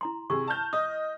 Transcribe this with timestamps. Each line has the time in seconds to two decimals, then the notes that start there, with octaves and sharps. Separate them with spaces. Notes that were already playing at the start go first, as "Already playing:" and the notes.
0.01 E4 A#5 C6
0.30 C3 G#4 C#6
0.47 A5 F6 G6
0.73 D#5 D#6